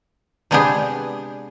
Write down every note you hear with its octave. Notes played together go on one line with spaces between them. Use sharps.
C3 G#3 B3 D4 G4 G#4